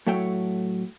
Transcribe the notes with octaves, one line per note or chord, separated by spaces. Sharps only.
A2 F#3 A3 F#4 C#5 G5